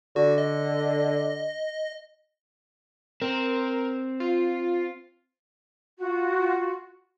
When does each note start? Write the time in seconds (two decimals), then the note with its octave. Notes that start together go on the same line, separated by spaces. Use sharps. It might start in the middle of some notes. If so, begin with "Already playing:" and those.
0.16 D3 F#4
0.38 D#5
3.22 C4 A#4
4.20 F4
5.99 F4 F#4